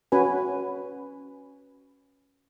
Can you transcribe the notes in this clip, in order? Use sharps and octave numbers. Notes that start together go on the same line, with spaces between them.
C#4 F#4 B4 G#5